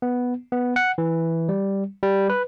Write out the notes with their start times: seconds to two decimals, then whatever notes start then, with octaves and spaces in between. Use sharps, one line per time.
0.02 B3
0.52 B3
0.76 F#5
0.98 E3
1.49 G3
2.03 G3
2.30 B4